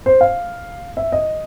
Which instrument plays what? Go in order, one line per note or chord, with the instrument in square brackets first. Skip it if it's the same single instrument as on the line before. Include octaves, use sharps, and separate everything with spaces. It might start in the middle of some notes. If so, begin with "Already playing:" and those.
[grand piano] C5
F5
E5
D#5